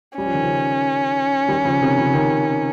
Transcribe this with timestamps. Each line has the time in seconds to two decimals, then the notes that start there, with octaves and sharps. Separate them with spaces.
0.17 G3 C#4
0.26 F3
0.34 D#3
0.42 C#3 F3
1.48 D#3 G3
1.64 C#3 F3
1.82 C3 D#3
1.97 C#3 F3
2.14 C3 D#3